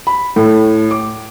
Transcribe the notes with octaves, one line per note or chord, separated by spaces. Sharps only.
B5
A2
D6